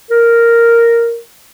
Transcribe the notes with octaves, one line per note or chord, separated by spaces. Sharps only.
A#4